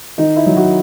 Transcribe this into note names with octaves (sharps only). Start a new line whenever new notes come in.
D#3 D#4
E4
F#3
F#4